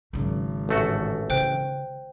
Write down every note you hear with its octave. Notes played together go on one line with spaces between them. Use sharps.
G#1 C#3 F#3
A1 A3 F#4
C#3 C5 G5 F#6